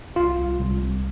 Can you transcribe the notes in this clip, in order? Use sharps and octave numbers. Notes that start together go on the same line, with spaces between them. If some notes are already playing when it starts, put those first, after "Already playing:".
C2 F4
C2
C2
C2